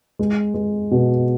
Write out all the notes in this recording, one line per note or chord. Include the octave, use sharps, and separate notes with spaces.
G#3
G#3
B2